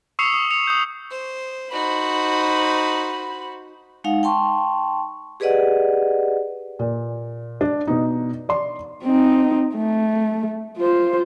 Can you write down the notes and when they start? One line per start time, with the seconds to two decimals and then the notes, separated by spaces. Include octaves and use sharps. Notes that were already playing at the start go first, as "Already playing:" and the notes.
0.19 C#6 D#6 E6 C7 C#7 F7
0.34 D#6
0.51 C#7 F7
0.67 D#6 G6
1.11 C5
1.72 D#4 F#4 C5 B5
4.04 G#3 D#4 F5 F#5
4.23 G5 A5 C6 C#6
5.40 G4 G#4 B4 D5 D#5 F#5
6.79 A#2
7.61 D4
7.87 B2 D#4
8.49 D5 C6
9.03 C4 D#4
9.75 A3
10.78 F4 C5